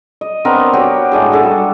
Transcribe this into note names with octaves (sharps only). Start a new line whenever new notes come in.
D#5
B3 C4 D4 A#4
F#4 G4 C#5 F#5
A2 G#3 D4 G#4
F#4 G#4 A4
G3